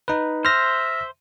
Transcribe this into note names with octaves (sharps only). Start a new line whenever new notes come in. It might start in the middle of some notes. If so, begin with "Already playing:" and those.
D#4 B4
C5 E5 F6 A#6